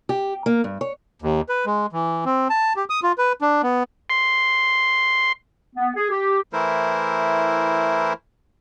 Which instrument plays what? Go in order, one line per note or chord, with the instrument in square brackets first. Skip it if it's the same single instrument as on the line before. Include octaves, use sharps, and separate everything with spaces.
[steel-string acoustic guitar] G4
A#3
G2
C#5
[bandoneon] D#2
B4
G#3
E3
C4
A5
G4
D#6
F4
B4
D4
B3
[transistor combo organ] C6
[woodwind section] B3
G#4
G4
[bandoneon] E3 A3 E4 A#4 C5